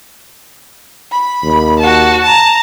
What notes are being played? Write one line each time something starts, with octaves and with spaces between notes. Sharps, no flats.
B5
D#2
F#4 A5
A5 A#5